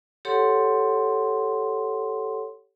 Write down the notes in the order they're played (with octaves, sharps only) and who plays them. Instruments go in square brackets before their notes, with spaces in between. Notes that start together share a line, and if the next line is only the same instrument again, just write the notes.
[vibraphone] G4 A4 C#5 F#5 C6